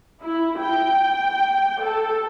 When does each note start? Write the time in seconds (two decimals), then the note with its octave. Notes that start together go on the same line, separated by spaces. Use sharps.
0.23 E4
0.61 G5
1.82 A4